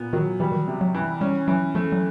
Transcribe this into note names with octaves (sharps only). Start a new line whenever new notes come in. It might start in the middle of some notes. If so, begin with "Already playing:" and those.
Already playing: A#2 B3
D#3 F#3
E3 G3
D#3
E3
C3
F#3
E3
G3 C#4
E3 F#3
F3 A3
F#3